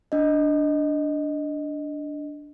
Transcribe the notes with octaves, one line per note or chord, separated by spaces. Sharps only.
D4 D#5